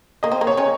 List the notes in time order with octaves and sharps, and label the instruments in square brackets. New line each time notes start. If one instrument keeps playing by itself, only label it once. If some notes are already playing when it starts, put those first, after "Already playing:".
[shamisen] A#3 [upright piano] D#5
[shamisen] C4
A#3
[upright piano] C#5
[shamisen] C#3 C#4